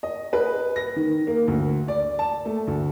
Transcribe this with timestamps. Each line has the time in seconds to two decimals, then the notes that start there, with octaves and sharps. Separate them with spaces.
0.03 D#5
0.33 B4
0.76 A#6
0.96 D#3
1.27 A#3
1.48 D2
1.88 D5
2.19 A5
2.45 A3
2.67 D2